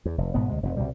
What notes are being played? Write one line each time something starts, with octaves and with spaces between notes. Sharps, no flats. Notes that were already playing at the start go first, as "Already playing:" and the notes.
E2
F1
G1 G#2 B2 B3
D2 C3 G#3
F1 B2
C2 B2 G3